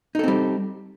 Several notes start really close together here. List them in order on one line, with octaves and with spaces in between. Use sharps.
D#4 A4 C4 G3